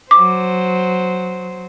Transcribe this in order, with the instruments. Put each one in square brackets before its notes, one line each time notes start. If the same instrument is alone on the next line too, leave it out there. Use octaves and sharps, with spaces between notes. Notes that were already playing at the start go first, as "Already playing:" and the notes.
[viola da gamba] F#3 C5 [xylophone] D6